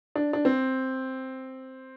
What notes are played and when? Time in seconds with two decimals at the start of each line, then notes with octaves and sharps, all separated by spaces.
0.16 D4
0.33 D4
0.45 C4